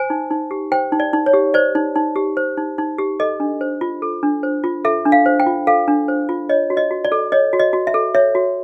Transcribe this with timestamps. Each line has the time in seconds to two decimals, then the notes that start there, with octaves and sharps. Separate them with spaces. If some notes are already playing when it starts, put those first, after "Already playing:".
Already playing: C5 G#5
0.10 D#4
0.31 D#4
0.51 G4
0.72 C5 G5
0.92 D#4
1.00 D5
1.13 D#4
1.26 C#5
1.33 G4
1.54 C5 D5
1.75 D#4
1.96 D#4
2.16 G4
2.37 C5
2.57 D#4
2.78 D#4
2.98 G4
3.20 A4 D#5
3.40 D4
3.61 C5
3.81 F4
4.02 A4
4.23 D4
4.43 C5
4.64 F4
4.85 A4 E5
5.06 D4
5.12 F5
5.26 C5
5.40 G5
5.46 F4
5.67 A4 F5
5.88 D4
6.08 C5
6.29 F4
6.49 C#5 D#5
6.70 F#4
6.77 D#5
6.91 F#4
7.05 D5
7.12 A4
7.32 C#5 D#5
7.53 F#4
7.60 D#5
7.73 F#4
7.87 E5
7.94 A4
8.15 C#5 E5
8.35 F#4